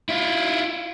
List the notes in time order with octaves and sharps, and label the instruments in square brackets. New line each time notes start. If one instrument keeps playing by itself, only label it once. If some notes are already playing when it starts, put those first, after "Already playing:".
[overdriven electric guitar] E4 F4